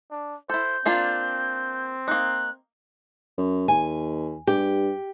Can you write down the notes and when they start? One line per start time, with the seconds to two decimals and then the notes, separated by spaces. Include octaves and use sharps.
0.11 D4
0.50 E4 A4 C5 G6
0.86 A#3 C4 D4 F4
2.08 A#3 D#4 F#6
3.38 F#2
3.68 D#2 G#5
4.47 G2 G4